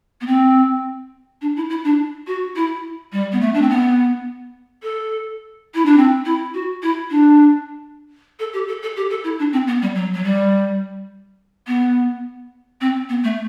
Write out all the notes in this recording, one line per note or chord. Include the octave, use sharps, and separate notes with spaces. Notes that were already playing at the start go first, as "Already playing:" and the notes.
B3
C4
D4
E4
E4
D4
F#4
E4
G3
B3
A3
D4
C4
B3
A4
E4
D4
C4
E4
F#4
E4
D4
A4
G4
A4
A4
G4
A4
E4
D4
C4
B3
G3
F#3
F#3
G3
B3
C4
B3
A3